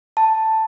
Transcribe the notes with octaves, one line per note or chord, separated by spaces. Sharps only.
A5